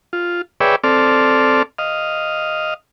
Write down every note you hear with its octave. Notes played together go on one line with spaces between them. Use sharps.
F4
G#4 B4 C#5 D5 E5 G5
C4 A4 D5 F6
D#5 F5